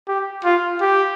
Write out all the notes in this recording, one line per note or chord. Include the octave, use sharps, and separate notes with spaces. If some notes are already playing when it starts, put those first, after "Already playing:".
G4
F4
G4